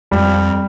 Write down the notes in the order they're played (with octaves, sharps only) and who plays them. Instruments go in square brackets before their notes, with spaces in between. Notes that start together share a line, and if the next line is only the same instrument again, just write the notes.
[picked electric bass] F2 [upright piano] G3